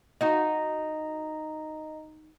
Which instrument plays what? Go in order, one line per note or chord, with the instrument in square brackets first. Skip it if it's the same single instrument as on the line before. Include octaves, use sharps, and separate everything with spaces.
[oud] D#4 F#4 [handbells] D#5 A#5